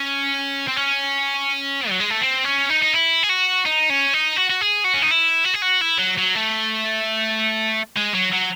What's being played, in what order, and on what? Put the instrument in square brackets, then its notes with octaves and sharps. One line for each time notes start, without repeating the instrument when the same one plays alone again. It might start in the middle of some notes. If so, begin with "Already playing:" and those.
Already playing: [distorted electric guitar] C#4
C4
C#4
F#3
G#3
A3
C4
C#4
D#4
D#4
E4
G#4
F#4
D#4
C#4
D#4
F#4
F#4
G#4
F#4
C#4
D#4
E4
F#4
G#4
F#4
E4
F#3
F#3
A3
G#3
F#3
F#3